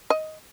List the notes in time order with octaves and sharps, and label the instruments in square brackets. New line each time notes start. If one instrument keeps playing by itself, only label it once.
[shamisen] D#5